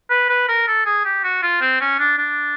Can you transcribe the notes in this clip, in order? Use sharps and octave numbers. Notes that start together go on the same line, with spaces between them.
B4
B4
A#4
A4
G#4
G4
F#4
F4
C4
C#4
D4
D4